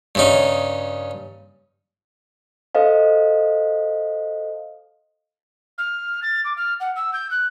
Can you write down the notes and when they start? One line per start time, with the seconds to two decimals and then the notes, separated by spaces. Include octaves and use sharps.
0.15 G2 C#3 D#4
2.75 A4 C5 D#5 F5
5.78 F6
6.22 A6
6.44 D6
6.57 F6
6.80 F#5
6.96 E6
7.13 G6
7.31 F#6